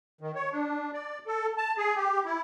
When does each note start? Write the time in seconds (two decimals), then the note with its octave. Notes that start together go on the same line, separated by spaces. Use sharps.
0.21 D#3
0.35 C#5
0.52 D4
0.93 D5
1.27 A4
1.57 A5
1.78 G#4
1.96 G4
2.25 E4